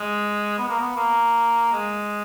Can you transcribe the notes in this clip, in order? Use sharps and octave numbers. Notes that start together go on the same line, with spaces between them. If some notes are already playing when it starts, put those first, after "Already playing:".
Already playing: G#3
B3
A#3
B3
A#3
G#3